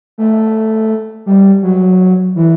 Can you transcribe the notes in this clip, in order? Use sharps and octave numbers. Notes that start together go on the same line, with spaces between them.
A3
G3
F#3
E3